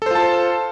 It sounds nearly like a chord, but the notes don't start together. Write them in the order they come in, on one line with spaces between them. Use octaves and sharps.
A4 C5 F4 A5